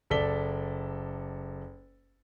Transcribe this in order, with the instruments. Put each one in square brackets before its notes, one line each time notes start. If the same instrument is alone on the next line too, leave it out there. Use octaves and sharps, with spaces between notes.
[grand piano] F#1 A4 D5 B6 G7